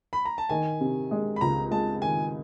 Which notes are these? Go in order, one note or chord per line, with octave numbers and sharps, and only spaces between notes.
B5
A#5
A5
D#3 G#5
C3
G#3
B5
C#2 A#5
G#3 A5
D#3 G#5